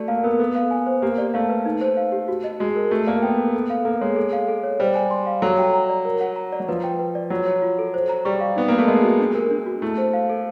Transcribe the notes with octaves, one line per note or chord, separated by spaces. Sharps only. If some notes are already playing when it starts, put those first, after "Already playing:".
Already playing: A3 F#4 D5
A#3 F5
B3 A#4
B3 A4
F5
G#5
C5
A#3 G4
D5
A3 F5
B4
D#4
C5
F5
G4
F#4
D#5
G#3 F#4
A#4
A3 F#4
A#3 D5
B3 G5
A4
A4
F5
A#3 A4
G#3 C#5
A4
F5
A4
C#5
G3 C5
G#5
C6
F5
F#3 A4
G5
A#5
D5
A#4
F#5
A#5
D5
F#3
F3 B4
G5
B4
D5
F#3 F4
C#5
F4
A4
C5
A#5
G3 C#6
F5
B3 D#4
A#3 A#4
A3
G#3 D#5
F#4
D4
A#4
D4
F#4
A3 E4
C5
F5
A4